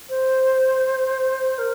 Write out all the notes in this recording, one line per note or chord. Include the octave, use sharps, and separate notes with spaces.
C5
A#4